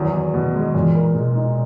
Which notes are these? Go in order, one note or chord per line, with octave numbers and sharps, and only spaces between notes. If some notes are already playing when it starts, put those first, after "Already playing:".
Already playing: E2 D#3 F#3
E2
B2
G#3
A#2 E3
A#4
B2 G#3
D#4